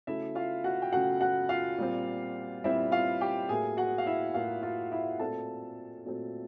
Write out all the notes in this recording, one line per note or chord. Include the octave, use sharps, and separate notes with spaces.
C#3 F#3 A3 E4 E5
F4 F5
F#4 F#5
G5
C#3 F#3 A3 F#4 F#5
F#4 F#5
F4 F5
A#2 G3 C4
A#2 G3 C4 E4 E5
F4 F5
G4 G5
A2 F#3 A#3 G#4 G#5
F#4 F#5
F5
E4 E5
A2 F#3 A#3 F4 F5
F4 F5
E4 E5
A#2 F#3 A3 C4 A4 A5
A#2 F#3 A3 C4